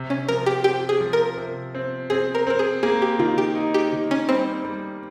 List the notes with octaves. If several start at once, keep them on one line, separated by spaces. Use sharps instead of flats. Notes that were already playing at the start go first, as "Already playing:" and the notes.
Already playing: C3
C#4
F3 A#4
G4
C4 G4
G#4
F3
A#4
C3
C4
C4 G#4
A#4
C4 A#4
G#4
A#3 G#4
G4
D#3 F4
G4
D#4
G4
D#3
C#4
G3 C4
G3